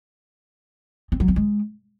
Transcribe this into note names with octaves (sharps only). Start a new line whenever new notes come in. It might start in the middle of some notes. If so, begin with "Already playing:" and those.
C4
F#3
C4
G#3